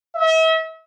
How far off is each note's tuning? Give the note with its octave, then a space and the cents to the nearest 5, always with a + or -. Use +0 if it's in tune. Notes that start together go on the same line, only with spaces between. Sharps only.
E5 -40